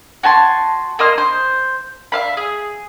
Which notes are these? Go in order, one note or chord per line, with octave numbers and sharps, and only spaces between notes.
F#4 G#5 A5 C6
A#3 D#5 C6 F6
C5
E5 F5 B5
G#4